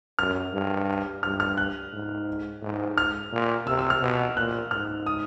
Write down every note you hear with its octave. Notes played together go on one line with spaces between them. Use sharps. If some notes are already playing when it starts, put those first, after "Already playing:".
F#2 F6
G2
G2 F6
F6
F#6
G#2
G#2
F6
A#2
C3 E6
E6
F6
B2
A#2 F#6
G#2 F6
D#6